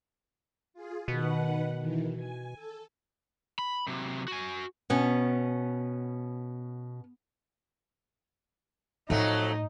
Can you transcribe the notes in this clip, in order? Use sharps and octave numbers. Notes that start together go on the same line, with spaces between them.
F4 G#4
B2 D#3 B4 F#5
D#3 E3
G#5
A4
B5
C3 F#3
F#4 G#5
B2 B3 C#4
F2 A2 F#3 A3 D#4